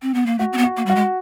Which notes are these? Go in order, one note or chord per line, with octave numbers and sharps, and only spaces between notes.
C4
B3
A#3
A3 F#4
C4
B3
F#4
A#3
G3 F#4
G#3